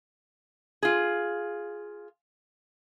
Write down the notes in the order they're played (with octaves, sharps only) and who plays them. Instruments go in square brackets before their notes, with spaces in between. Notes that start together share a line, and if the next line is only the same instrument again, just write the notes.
[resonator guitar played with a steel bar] F4 G#4